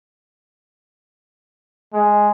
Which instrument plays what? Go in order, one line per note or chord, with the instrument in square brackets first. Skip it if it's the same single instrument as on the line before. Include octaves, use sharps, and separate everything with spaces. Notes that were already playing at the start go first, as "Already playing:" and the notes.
[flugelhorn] G#3